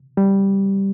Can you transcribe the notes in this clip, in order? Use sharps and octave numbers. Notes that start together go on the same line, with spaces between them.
G3